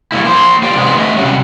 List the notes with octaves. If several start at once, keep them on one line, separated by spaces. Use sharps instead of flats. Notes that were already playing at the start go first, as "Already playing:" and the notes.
G3 A3 A#3 E4
A#3 C5
F4 G4 D5
C3 D#3 G#3 B3 C4
A3 D#5 E5
C3 F#3 G3 C#4